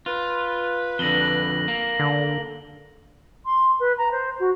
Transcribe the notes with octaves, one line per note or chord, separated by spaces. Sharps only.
F4 B4
F2 D3 A#6 F#7 G7
A#3
D3
C6
B4
A#5
C5
F#4